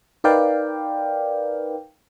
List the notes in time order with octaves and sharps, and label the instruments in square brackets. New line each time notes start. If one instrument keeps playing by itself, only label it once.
[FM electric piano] D#4 A#4 B4 D5 F5 G5